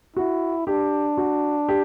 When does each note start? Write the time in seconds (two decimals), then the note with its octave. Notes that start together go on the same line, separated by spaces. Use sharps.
0.16 E4 F#4
0.67 D4 G4
1.17 F#4
1.69 G4